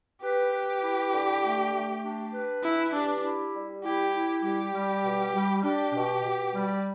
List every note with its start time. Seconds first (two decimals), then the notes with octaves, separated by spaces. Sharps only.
0.23 G4 B4
0.52 B4
0.82 E4
1.13 D3
1.42 A3
1.74 A3
2.03 D4
2.33 B4
2.63 E3 E4
2.93 D4 G4
3.23 E4
3.54 G3
3.83 E4 G4
4.14 E4
4.43 G3 G4
4.74 G3
5.04 B2
5.34 G3
5.64 D4 G4
5.94 B2
6.25 B2
6.54 G3